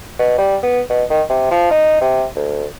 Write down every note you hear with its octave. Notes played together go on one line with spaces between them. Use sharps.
B2
G3
B3
B2
D#3
C3
F3
D#4
C3
D2